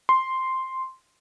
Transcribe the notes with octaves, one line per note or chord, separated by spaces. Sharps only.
C6